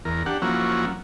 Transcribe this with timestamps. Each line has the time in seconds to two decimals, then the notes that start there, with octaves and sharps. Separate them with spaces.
0.05 E2 A#4
0.26 D4 G4 F#5
0.42 F3 F#3 A#3 C#4 E4 F#4